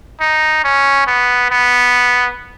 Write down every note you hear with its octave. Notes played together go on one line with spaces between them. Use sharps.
D#4
C#4
B3
B3